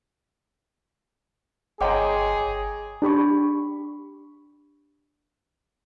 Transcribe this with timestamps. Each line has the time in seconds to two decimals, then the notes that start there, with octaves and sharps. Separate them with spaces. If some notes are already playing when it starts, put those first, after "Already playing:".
1.81 G1 G#4 C#5 D#5 G5 A#5 C6 D6
3.02 D4 G4 B5 C#6